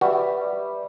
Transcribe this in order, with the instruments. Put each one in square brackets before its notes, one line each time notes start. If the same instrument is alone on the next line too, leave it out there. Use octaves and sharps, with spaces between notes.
[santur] G3 [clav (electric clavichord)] F#4 [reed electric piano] B4 E5